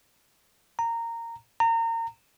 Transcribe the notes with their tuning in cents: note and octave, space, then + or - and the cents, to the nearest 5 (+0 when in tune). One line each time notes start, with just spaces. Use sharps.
A#5 -15
A#5 -30